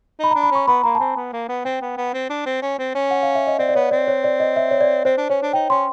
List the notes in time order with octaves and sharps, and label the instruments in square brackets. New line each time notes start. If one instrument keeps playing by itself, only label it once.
[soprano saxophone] D#4 [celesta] B5
[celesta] A#5
[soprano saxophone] D4
[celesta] B5
[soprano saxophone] C#4 [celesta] C#6
[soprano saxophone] B3 [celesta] B5
[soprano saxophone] A#3 [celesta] A#5
[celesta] A5
[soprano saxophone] C4 [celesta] G#5
[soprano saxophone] B3
A#3
B3
[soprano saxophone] C4 [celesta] G5
[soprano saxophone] B3
B3
C4
D4
C4
C#4
C4
C#4
[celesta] F#5
F5
E5
D#5
[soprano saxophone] C4 [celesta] D5
[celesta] D5
[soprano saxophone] B3 [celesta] C#5
[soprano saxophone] C4 [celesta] D5
[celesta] C#5
D5
D#5
E5
C#5
D5
[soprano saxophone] C4 [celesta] C5
[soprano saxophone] D4
[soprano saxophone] C#4 [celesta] C#5
[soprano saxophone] D4
[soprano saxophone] D#4 [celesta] G5
[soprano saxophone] C#4 [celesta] C6